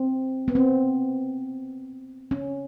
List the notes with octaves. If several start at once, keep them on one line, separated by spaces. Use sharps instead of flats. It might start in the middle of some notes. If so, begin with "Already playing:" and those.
Already playing: C4
B3
C4
C#4